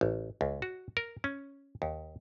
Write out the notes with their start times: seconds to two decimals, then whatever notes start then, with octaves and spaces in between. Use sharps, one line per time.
0.01 A1
0.41 C#2
0.62 F#4
0.97 A#4
1.24 C#4
1.82 D#2